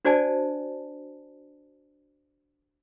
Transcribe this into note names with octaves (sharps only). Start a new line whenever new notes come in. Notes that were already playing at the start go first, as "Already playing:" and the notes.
D4 F#4 C5 D5 G#5 A5